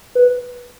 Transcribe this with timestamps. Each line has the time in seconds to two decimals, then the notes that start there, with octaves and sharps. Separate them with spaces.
0.15 B4